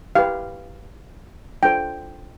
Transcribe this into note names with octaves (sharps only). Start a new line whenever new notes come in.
E4 G4 B4 F5
D4 F4 A4 C5 G5